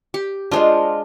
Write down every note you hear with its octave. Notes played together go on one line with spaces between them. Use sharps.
G4
G#3 D4 F4 C5 D#5